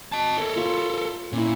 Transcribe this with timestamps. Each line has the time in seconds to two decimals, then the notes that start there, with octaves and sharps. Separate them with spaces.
0.12 D#5 A5
0.38 A4 A#4 C#5 E5
0.56 F4 B5 C#6
1.33 A#2 C#4 E4